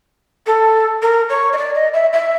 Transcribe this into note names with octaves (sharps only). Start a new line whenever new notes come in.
A4
A#4
C#5
D#5
D5
D#5
E5
E5